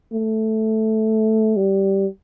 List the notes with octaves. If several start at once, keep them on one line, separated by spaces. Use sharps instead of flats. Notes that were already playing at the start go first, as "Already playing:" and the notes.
A3
G3